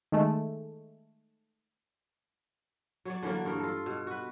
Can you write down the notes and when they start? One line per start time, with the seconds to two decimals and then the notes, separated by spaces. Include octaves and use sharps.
0.12 D#3 G#3 A3
3.05 F#3 C#5 D5
3.23 D3 E3 F#3 A#3
3.45 G2 E3 A#4
3.60 F4 A4
3.86 B2
4.07 F#4 B4